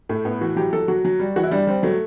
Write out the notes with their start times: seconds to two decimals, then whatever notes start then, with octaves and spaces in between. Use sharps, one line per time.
0.09 A2 A3
0.25 A2 B3
0.41 E3 F#4
0.56 F#3 G4
0.73 F#3 A4
0.88 F#3 F#4
1.05 F#3
1.20 G3
1.36 E3 F#4
1.43 E4
1.51 G3 D4
1.67 G3 C4
1.83 F#3 A3